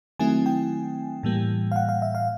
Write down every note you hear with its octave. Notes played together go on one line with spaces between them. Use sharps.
D#3 F#3 A3 C4 E4 G#5
G5
A2 E3 G3 A#3
F5
F#5
F5
E5
F5